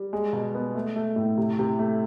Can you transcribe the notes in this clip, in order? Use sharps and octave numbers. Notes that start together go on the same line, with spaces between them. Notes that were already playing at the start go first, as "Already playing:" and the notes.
Already playing: G3
G#3
B2
B3
A3
A3
A2
C3
C3
A3